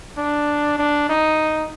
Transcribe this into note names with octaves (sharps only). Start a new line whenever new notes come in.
D4
D4
D#4